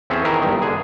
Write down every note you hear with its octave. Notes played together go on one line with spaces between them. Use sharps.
E2 C4 C#4 G#4 A4 E5
D#3 E3 G#4 A#4 E5
G1 G2 D#3
D3 G#4